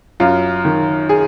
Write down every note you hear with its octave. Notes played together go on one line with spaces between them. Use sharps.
F#2 F4
D#3
G#4